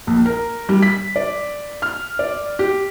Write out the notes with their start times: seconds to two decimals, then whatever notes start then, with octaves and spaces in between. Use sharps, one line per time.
0.07 A#1
0.26 A#4
0.69 G3
0.83 B6
1.16 D5
1.82 F6
2.19 D5
2.59 G4